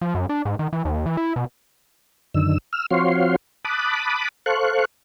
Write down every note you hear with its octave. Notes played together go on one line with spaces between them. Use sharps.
F3
F#2
D4
G#2
D#3
E3
D#2
E3
E4
B2
F#2 D3 D#3 E6
E6 F6
F3 C4 F#4 C#5 F5 C6
A5 B5 D6 D#6 F#6
A4 C5 F5 C#6 F#6